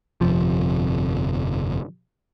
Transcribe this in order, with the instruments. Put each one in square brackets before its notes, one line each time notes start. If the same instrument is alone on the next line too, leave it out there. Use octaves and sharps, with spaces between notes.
[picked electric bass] G1 F2 C3 F3